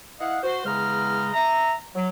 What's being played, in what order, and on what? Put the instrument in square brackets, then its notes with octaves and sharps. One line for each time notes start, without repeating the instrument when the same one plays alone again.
[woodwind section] E4 D#5 F5 F#5
F#4 C5
E2 C#3 G#3 A#5 F6
E5 A#5
F#3